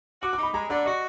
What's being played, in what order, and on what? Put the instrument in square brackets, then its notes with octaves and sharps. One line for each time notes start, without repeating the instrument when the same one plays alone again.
[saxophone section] F#4 [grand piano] D6
[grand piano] D6
[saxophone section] D#4 [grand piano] B5
[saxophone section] G#3 [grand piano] A#5
[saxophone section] D3 [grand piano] D5
[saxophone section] F#4 [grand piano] D#5